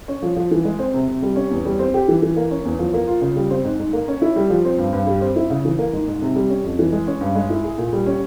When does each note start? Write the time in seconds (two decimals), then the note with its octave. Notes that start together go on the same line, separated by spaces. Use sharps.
0.08 C#4
0.22 F3
0.36 F3
0.51 E3
0.65 G#3
0.79 C4
0.94 C3
1.08 C3
1.22 G3
1.36 C#4
1.51 E2
1.65 G3
1.79 C4
1.94 G4
2.08 E3
2.22 E3
2.37 A#3
2.51 C#4
2.65 E2
2.79 F3
2.94 A#3
3.08 F4
3.21 C#3
3.36 G3
3.50 C4
3.64 G#2
3.79 G#2
3.93 A#3
4.08 C#4
4.22 E4
4.36 G3
4.50 F3
4.65 C4
4.78 G2
4.92 G2
5.07 G3
5.21 C4
5.36 E4
5.50 C#3
5.65 E3
5.78 A#3
5.93 G#2
6.08 G#2
6.22 C3
6.35 G3
6.50 C#4
6.64 F2
6.79 E3
6.92 G#3
7.07 C#4
7.21 G2
7.35 G#3
7.50 E4
7.64 G#4
7.78 A#2
7.93 G3
8.06 C#4